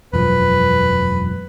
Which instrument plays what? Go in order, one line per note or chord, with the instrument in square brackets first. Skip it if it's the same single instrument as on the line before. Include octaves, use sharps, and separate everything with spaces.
[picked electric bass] E1 F#2 F3 [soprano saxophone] B4